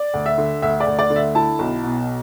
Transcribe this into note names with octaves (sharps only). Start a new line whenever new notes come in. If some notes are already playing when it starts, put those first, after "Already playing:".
Already playing: D5
D2
E5
D3
D2 E5
D5
D2
D5
D3
E5
E4 A5
B1
B2